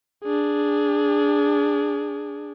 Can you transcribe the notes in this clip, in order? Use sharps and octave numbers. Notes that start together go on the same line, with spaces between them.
D4 G#4